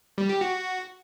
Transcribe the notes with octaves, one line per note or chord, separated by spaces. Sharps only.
G3
G4
F#4